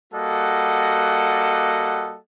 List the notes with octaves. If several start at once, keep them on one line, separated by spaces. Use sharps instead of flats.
G3 A#3 F#4 A4 D#5 F#5